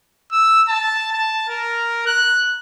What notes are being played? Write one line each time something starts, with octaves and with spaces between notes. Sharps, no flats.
E6
A5
A5
A#4
F#6